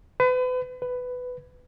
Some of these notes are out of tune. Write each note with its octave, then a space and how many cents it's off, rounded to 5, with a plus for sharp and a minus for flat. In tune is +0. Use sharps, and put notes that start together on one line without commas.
B4 +35
B4 +10